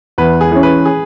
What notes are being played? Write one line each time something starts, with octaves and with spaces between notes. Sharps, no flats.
E2 B4
G#4
E3 C#4
B4
G#4